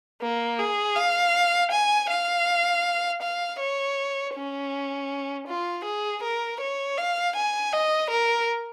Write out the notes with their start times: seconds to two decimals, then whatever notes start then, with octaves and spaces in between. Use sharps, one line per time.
0.22 A#3
0.59 G#4
0.96 F5
1.72 G#5
2.09 F5
3.22 F5
3.59 C#5
4.35 C#4
5.47 F4
5.85 G#4
6.23 A#4
6.60 C#5
6.98 F5
7.36 G#5
7.73 D#5
8.10 A#4